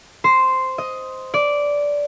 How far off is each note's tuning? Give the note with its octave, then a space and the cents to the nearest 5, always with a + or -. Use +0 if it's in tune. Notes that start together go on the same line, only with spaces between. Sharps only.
C5 -5
D#5 +10
D5 -10